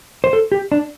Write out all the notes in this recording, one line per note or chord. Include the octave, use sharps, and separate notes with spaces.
C5
A4
G4
D4